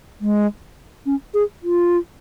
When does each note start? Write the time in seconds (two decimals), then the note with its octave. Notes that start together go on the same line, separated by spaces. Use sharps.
0.21 G#3
1.06 C#4
1.34 G#4
1.63 F4